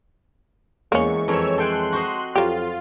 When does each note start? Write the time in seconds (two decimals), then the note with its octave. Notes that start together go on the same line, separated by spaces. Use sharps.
0.92 E2 G#3 A#3 C#4 C#6
1.28 F2 E3 A#4 C#5 E6
1.58 A4 G5 G#5 C6 F#6
1.93 F#4 C5 D#5
2.36 F2 F#3 F4 G4